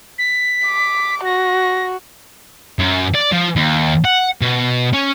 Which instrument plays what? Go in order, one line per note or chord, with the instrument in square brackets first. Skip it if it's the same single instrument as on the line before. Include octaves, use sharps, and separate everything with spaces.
[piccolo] B6
[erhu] D6
[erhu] F#4 [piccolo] A#6
[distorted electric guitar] F#2
D5
F3
D#2
F#5
B2
C#4